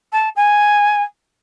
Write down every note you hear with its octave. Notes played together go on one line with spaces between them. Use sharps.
A5
G#5